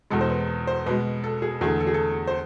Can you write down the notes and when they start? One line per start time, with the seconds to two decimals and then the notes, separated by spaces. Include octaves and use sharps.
0.10 E2 B2 G#3 A4
0.21 C5
0.30 B4
0.67 C5
0.86 B2 G#3 B4
1.24 A4
1.42 G#4
1.61 E2 D3 A3 G#4
1.80 A4
1.87 G#4
1.94 A4
2.27 C5